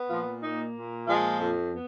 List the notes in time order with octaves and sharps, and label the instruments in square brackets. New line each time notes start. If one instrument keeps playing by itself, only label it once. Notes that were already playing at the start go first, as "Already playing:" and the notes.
Already playing: [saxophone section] B3
A#2 F3 F4
A#3 D#4
A#2
F3 G#3 F4
F2
B3